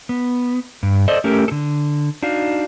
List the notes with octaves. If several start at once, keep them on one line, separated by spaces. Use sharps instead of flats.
B3
G2
A4 C5 D5 D#5
A3 C#4 G4 A4 A#4
D3 A4
D4 D#4 F#4 F5